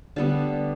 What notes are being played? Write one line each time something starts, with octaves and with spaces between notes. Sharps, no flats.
D3 G3 B3 A5